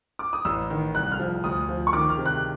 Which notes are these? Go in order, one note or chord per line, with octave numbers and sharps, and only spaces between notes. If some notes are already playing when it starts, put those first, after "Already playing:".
D6
D#6
A1 E6
D#3
C2 F#6
F6
F3
D2 D#6
F3
C#6
D#3 D6
F6
C3
F#6